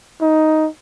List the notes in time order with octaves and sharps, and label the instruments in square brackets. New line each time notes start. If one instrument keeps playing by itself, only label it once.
[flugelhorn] D#4